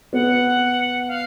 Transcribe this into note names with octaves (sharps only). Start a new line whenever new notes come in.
B3 F#5
F5